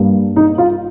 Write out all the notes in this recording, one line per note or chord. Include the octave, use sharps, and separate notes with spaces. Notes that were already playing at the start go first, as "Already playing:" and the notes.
Already playing: G2 G3 A#3
D#4
F4